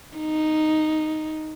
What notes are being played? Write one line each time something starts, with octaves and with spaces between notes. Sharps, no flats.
D#4